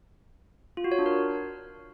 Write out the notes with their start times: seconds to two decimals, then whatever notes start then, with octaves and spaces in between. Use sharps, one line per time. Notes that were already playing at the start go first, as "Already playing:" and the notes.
0.77 F4
0.84 F#4
0.92 C#5
0.99 D4
1.06 A#4